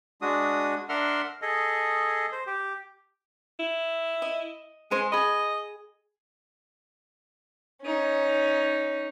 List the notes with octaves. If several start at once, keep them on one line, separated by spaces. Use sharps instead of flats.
G#3 D4 F#4 D#6
D4 A#4 E5 F#5 C6 F6
G#4 A4 D#5
C5
G4
E4
D#5
G#3 C5 G#5
G#4 D#5 B5
C#4 D#4